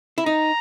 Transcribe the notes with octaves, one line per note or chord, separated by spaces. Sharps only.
E4
D#4 A#5